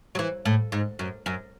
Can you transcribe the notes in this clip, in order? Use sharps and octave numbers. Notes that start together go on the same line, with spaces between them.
F#3
E3
A2
G#2
F#2
F#2